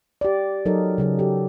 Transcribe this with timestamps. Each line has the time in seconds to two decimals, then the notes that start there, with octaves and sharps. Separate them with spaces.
0.21 G4 D5
0.66 F#3 D#4 A4 A#4 D#5
0.98 C#3 F#3 G#4
1.19 G4 A4